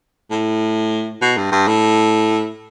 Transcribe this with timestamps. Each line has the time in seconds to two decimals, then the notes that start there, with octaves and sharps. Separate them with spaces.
0.31 A2
1.21 B2
1.37 G2
1.52 G2
1.67 A2